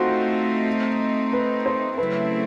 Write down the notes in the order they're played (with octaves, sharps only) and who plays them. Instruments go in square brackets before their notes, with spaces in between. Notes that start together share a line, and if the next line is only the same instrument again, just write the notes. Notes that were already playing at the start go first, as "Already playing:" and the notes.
Already playing: [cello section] A3 C4 D#4 [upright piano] F4 F#4 C5
[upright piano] B4
C5
[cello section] C#3 F#3 A3 C4 E4 [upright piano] B4